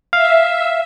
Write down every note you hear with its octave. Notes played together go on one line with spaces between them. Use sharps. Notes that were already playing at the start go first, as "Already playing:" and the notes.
E5 F5